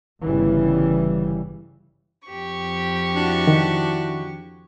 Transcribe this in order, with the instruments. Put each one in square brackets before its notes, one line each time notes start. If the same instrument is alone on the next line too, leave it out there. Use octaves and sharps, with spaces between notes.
[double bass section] G1 C#3 E3 G3
[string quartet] F2 G4 C#6
[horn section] D4 E4 F#4
[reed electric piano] D#3